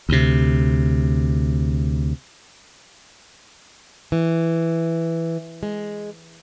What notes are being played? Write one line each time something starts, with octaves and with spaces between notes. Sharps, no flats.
D2 C3
E3
G#3